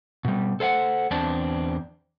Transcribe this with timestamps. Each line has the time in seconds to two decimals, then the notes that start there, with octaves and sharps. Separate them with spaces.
0.25 B2 G3
0.60 A4 C5 F5 F#5
1.11 E2 C4 D4 A5